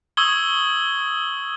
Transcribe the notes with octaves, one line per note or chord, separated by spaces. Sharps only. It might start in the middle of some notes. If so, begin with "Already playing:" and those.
C#6 D#6 E6 G#6 F#7 G7